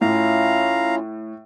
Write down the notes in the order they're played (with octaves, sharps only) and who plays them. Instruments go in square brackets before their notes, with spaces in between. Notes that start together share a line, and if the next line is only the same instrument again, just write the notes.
[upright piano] A2 [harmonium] C#4 E4 F4 [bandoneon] F5 A#5